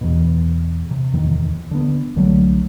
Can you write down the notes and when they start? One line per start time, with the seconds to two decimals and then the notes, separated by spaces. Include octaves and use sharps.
0.01 E2 B2
0.91 C3
1.14 D1 E2 D#3
1.71 D3 B3
2.16 C2 D3 F#3 A3